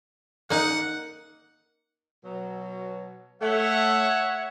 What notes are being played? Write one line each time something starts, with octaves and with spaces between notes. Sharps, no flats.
A#3 D#4 F#5
B2 F#3
A3 C#5 E5 F#5